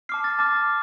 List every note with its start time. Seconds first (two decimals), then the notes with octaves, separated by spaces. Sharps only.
0.09 A5 D6 F6 C7
0.24 A6
0.39 A5 D6 F6 A6